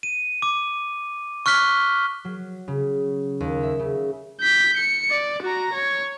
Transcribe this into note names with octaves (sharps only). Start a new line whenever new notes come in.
D#7
D6
C#6 F6 F#6 B6 G7
F#3
C#3
D#2
E5
C#3
G6 B6
C#7
D5
F#4 A#5
C#5